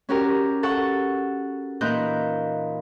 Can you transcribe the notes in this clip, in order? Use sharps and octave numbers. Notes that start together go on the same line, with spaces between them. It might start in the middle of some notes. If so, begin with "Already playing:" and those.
C#4 F#4 G4 A#4
A4 F#5 C#6
A#2 E3 D#4 F#6 G6